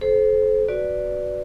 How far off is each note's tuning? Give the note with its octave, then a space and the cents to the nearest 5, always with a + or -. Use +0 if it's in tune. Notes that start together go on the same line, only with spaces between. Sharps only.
A4 -35 C5 +0
F#4 +0 B4 +0 D5 +0